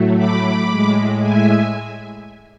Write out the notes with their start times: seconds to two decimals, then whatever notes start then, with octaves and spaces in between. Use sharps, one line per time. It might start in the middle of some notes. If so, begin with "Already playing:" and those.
Already playing: A2 F#3 A3
0.17 B5 D6
0.70 A2 G#3
1.22 E5 G#5